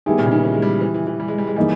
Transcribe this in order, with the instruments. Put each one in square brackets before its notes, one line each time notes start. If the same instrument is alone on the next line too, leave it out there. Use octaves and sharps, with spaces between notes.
[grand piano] D#3 [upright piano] G3 B3 E4 G#4
[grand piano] A#2
C#3
D#3
E3
G#3
G3
E3
E3
E3
G3
G#3
G3
G#3
[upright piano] E3 A#3 D#4 G#4 [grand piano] G3